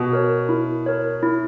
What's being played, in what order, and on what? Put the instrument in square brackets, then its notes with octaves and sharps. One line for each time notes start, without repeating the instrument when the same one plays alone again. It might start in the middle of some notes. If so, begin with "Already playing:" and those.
Already playing: [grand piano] B2
[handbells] A#4 C#5
E4
A#4 C#5
E4